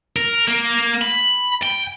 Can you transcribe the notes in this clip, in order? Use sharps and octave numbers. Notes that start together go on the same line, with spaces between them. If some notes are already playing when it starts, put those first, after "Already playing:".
A#4
A#3
B5
G5